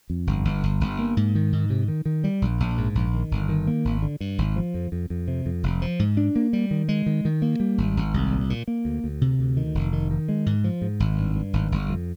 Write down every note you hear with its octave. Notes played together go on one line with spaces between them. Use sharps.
F2
G1
G1
G1
G1
A#3
G#2
D#3
G#2
C3
D#3
D#3
G3
A#1
A#1
G#2
A#1
D#3
G1
D#3
A#3
G#1
D3
G2
G#1
F3
F2
F2
F2
C3
F2
F1
F3
G#2
D4
A#3
G3
D#3
G#3
D#3
D#3
A#3
G3
G#1
G#1
C2
A#2
A#2
A#3
D2
D2
C3
D2
D#3
F1
D#3
D#3
G#3
G#2
F3
G#2
G#1
G2
G2
G#1
G1
F2